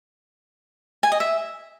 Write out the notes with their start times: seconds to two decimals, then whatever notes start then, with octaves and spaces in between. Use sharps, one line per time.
1.03 G#5
1.12 D#5
1.20 E5